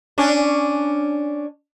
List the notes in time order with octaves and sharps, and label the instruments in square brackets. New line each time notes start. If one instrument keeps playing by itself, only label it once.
[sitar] C#4 D4